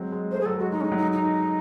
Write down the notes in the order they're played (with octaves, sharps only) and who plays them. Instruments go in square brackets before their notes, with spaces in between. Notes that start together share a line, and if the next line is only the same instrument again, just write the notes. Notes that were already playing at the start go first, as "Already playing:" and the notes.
Already playing: [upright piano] F#3 G#3 C4
G#3
[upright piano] A3 [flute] C5
[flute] G#4
[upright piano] F#3 [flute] A4
[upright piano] G#3 [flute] F#4
[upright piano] G#3 [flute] D#4
[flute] C#4
D#4
[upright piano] F#3
[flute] D#4
D#4